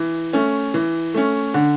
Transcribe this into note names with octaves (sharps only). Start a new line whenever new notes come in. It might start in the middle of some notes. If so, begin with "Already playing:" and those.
Already playing: E3
A3 C#4
E3
A3 C#4
D3